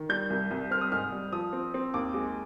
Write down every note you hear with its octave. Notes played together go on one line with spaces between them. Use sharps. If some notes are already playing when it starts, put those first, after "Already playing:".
Already playing: D#3
G3 G6
C2
C2
C4 F6
D#6
G#2 F6
G3
F3 D#6
C4
C4
D#2 D6
G#3